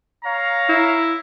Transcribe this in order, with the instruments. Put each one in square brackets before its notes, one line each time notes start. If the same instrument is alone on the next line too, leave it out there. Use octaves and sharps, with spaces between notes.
[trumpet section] C#5 F5 A#5
[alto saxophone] E4